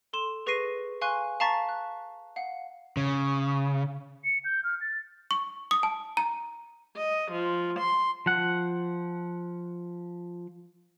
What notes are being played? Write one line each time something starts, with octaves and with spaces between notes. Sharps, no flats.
A4 C6 E7
G#4 B4 C#6 A#6 C7 D#7
F5 G#5 C6 C#6 F#6 D#7
F5 A5 A#5 C#6 A6 B6
F#6
F5 F#5
C#3
C#7
G6
F6
A6
C#6
D#6
A5
A#5
D#5
F3
C6
F3 F#5